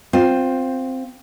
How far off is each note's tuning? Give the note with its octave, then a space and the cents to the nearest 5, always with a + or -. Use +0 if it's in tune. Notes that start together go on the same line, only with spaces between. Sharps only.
C4 +0 F4 +20